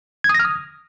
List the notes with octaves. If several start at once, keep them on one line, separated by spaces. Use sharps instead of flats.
G#6
D#6
A#6
F6
D#6